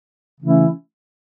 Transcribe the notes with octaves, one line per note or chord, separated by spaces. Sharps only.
C#3 E3 A3 C#4 E4